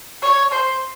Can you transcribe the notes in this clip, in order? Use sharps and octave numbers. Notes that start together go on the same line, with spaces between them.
C#5
C5